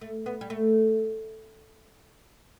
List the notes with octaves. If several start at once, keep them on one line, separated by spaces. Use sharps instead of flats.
A3
B3
G3
A3